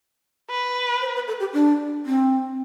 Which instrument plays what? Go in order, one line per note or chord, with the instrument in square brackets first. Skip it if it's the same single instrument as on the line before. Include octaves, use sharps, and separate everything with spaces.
[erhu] B4
[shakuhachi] C5
B4
A4
G4
D4
C4